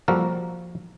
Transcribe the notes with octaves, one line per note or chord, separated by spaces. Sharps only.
F3 G3 A#3 F#4 A4 A#4